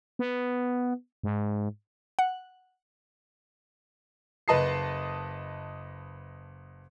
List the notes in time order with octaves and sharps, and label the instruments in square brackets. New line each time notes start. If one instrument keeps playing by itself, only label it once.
[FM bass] B3
G#2
[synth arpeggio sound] F#5
[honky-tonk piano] F#1 B4 D#5 A5 D#6 C7